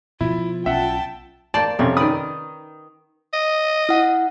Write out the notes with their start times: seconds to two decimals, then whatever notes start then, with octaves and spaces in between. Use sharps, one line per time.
0.21 B2 F3 E4 F4
0.66 B1 C#4 E5 F#5 G5 A5
1.54 A#3 C5 D5 A5
1.79 F2 C3 C#4
1.97 D#3 B4 D5 D#6
3.33 D#5
3.89 E4 F#5